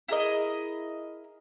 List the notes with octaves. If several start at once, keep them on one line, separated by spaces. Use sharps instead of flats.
E4 G#4 A#4 D#5